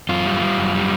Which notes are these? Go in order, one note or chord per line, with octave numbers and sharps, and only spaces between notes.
F#2 F4
G3
G3
F#2
G3